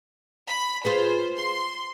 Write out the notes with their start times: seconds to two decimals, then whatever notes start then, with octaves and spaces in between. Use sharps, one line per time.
0.49 B5
0.85 F4 G#4 B4 C5
1.36 C6